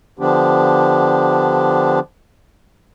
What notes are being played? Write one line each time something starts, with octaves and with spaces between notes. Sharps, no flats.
D3 F3 B3 D4 G4